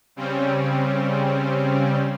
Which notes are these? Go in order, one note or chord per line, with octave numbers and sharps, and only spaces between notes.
C#3 G3 C4 C#4